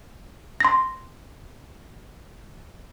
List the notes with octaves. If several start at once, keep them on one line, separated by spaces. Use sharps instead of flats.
C6 A#6